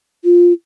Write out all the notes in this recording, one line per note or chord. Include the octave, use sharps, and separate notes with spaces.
F4